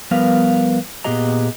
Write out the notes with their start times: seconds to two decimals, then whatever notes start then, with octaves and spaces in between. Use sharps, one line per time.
0.11 F3 G3 B3 A#4 B4 F5
1.04 A#2 B3 G4 G#4 D#5 A#5